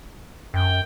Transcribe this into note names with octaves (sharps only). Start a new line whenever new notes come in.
F#2 G5